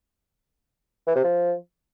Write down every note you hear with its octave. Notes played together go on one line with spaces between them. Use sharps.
E3
C3
F3